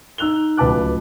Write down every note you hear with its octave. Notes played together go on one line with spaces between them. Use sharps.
D#4 E6 F#6 F7 G7
D1 C#2 B4 A5 D6 F#6